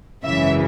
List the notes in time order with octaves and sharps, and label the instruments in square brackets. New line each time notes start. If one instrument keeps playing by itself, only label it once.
[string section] G#1 F#2 C#3 E3 E5